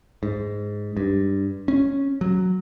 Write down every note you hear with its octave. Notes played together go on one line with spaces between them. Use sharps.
G#2
G2
C#4
F#3